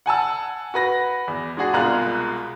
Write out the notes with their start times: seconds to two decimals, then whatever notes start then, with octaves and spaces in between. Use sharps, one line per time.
0.06 F#5 G#5 A5 E6
0.74 F#4 B4 A#6
1.28 E2
1.57 G#3 D4 F#4 G#4
1.73 C2 B2 G#3 F4 A#5 F#6